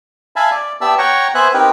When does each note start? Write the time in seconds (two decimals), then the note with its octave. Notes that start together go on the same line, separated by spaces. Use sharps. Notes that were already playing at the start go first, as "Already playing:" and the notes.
0.36 E5 F5 G#5 A5 B5
0.51 D5
0.81 B3 G4 D5 E5 A5 E6
0.98 C#5 F#5 G5 A#5 C#6
1.35 B3 C5 E5 G#5 F#6
1.54 C4 D#4 G4 A#4 B4